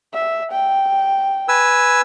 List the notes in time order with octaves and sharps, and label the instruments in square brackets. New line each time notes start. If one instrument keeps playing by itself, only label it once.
[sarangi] E5
G5
[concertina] B4 G#5 E6